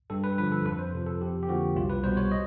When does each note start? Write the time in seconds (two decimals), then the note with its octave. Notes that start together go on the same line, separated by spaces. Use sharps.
0.10 G2 A4
0.24 B4
0.38 D3 F3 B4
0.52 A4
0.66 F2 B4
0.79 C5
0.94 C3 F3
1.06 A4
1.21 F2 G4
1.43 G4
1.49 D3 F3 A#3 F#4
1.76 C2 F4
1.90 B4
2.04 B2 G3 B3 C5
2.17 C#5
2.32 D#5